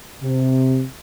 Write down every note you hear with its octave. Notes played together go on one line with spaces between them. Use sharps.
C3